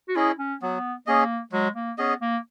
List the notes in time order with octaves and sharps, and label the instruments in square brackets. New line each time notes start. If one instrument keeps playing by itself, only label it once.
[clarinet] F#4
[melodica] C#4 G#4 D#5 [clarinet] E4
[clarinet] C#4
[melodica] F#3 [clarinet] B3
[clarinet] A#3 [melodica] C#4 G#4 D#5
[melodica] F#3 [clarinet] G#3
[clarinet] A#3
[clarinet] B3 [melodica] C#4 G#4 D#5
[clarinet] A#3